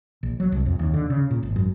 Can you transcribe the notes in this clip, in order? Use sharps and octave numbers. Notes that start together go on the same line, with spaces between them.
A#1
F#3
C2
F2
D#2
D3
C#3
A#2
G#1
F#2